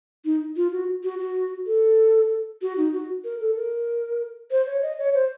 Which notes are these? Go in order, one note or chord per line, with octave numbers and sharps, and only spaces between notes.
D#4
F4
F#4
F#4
F#4
A4
F#4
D#4
F#4
A#4
A4
A#4
C5
C#5
D#5
C#5
C5